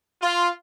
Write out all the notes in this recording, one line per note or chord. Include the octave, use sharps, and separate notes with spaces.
F4